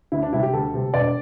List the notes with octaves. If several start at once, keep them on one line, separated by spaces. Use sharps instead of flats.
D2 E4
D4
C3 G3 E4
G4
D2 A4
C3 G3
E1 D5